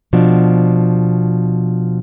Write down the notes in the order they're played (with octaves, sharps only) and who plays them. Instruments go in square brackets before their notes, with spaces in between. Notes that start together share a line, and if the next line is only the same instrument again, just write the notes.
[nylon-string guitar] B2 F3 D4